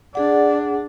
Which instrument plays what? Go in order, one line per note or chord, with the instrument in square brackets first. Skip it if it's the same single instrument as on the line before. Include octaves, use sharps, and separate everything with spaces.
[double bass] D4 [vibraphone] G#4 F#5 [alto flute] D5